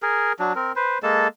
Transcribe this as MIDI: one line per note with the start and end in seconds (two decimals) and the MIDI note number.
0.02 0.33 68
0.02 0.33 70
0.39 0.53 54
0.39 0.53 62
0.55 0.72 60
0.55 0.72 70
0.76 0.98 71
0.76 0.98 72
1.03 1.28 56
1.03 1.28 58
1.03 1.28 69
1.03 1.28 81